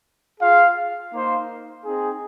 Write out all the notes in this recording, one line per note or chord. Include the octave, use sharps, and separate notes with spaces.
F4 G#4 F5
A#3 D#4 C5 F5
C4 D#4 G#4